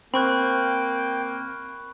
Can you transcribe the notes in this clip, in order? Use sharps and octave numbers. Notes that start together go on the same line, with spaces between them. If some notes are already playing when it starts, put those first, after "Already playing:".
A#3 C4 G5 B5 C#6 F#6